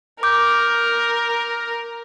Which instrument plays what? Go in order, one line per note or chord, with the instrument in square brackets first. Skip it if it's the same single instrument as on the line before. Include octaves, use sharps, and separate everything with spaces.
[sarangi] A#4 [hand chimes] D6 G6